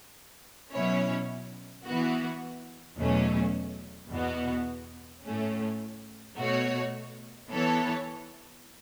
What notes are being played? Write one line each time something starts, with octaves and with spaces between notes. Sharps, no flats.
B2 F#3 C#4 E4 C#5
E3 B3 F#4
E2 B2 F#3 A3 C#4
E2 B2 B3 F#4
A2 A3 C#4
B2 A3 F#4 C#5
E3 B3 A4 C#5